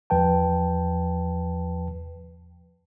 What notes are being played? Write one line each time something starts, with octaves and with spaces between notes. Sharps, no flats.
E2 F3 B4 G5 A5